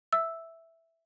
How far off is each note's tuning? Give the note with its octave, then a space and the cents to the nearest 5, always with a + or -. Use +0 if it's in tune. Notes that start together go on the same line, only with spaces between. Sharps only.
E5 +0 E6 +0